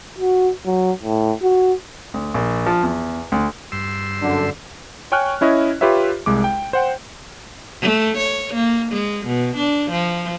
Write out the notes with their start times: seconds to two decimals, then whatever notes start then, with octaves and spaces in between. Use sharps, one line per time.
0.18 F#4
0.66 F#3
1.03 A2
1.43 F#4
2.14 D2
2.34 A#1
2.66 F3
2.83 E2
3.32 D2
3.72 G2 C6 E6
4.21 F#2 D3
5.12 C#5 G5 G#5 C#6 F6 F#6
5.41 C#4 E4 C#5 D#5
5.81 F4 G4 B4 C#5 E5
6.26 C2 G#3 D6
6.44 G5
6.73 C5 F#5 G5
7.81 A3
8.18 C#5
8.54 A#3
8.92 G#3
9.26 B2
9.56 D4
9.91 F3